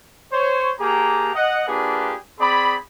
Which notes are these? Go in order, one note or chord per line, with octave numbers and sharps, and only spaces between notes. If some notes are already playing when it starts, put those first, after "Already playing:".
C5 C#5
A#3 G4 G#4 A5 A#5
D#5 F#5
A#3 D4 F4 G4 G#4 B4
C4 G#4 D5 B5